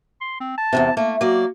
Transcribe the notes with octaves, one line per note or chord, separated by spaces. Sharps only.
C6
C4
A5
E2 G#2 C3
A3 A#3
F#3 A#3 D5